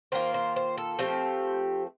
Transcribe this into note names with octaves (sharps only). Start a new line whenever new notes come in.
D#3 A#3 F4 C5
C5
C5
A4
F3 A3 C4 G4